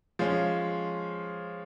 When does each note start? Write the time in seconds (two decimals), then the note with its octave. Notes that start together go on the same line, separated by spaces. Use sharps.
0.19 F3 G#3 C#4